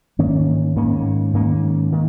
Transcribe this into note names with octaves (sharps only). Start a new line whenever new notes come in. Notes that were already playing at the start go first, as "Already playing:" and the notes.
G#2 D#3 A#3 C#4
G#2 D#3 A#3 C#4
G#2 D#3 A#3 C#4
D#3 A#3